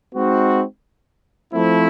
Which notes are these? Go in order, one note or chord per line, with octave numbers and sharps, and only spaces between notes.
G#3 C4 D#4 F#4
F3 A3 C4 E4